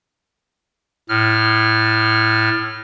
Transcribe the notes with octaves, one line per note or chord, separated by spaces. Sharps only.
A2 F6